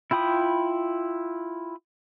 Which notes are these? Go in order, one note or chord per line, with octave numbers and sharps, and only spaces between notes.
E4 F4 G5 B5 D#6